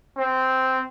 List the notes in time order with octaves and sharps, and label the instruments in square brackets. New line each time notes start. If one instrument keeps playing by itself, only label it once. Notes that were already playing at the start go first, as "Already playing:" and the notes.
[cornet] C4